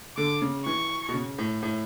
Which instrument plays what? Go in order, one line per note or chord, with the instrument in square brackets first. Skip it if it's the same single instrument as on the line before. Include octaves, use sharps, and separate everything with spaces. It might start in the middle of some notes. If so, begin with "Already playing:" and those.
[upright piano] D3 [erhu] D6
[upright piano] C#3
[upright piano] E3 [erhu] C#6
[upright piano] B2
C#3
A2
A2